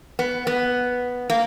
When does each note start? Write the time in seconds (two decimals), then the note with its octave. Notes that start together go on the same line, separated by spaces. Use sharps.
0.19 B3
0.47 B3
1.30 A#3